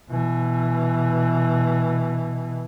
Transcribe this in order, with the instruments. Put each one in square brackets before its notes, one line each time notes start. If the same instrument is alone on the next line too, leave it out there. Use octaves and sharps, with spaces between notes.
[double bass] B2 E3